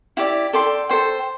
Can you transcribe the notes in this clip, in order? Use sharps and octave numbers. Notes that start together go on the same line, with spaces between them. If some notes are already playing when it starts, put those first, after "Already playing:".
E4 G4 D5
A4 D5 G5 C6
A4 C5 G5